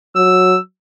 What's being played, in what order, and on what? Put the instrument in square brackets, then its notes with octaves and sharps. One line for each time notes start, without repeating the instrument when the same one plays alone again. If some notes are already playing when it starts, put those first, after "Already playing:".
[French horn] F#3 [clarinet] E6